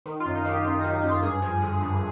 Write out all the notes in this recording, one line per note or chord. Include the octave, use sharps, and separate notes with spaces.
D#3
F4
F#2
D#4
D#3 G4
F#2 F4
D#3 D#4
D#4
F#2
F4
G2 G#4
F3
D3
G2